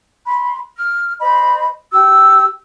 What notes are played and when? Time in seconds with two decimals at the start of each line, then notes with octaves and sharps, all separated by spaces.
0.25 B5 C6
0.75 F6
1.20 C5 D#5 B5
1.91 G4 E6